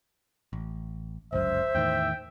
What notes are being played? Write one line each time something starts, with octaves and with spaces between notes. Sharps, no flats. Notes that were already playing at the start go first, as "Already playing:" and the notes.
A1
G1 C#2 F#2 C5 E5
E2 A2 D#3 G5